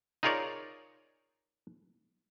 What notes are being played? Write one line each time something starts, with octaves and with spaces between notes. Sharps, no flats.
D#4 F4 G#4 A#4 C#5 D5